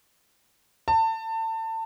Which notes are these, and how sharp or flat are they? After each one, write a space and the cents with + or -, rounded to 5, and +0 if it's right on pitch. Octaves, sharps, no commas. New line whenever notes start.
A5 +30